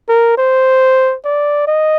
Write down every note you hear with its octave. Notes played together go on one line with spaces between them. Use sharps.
A#4
C5
D5
D#5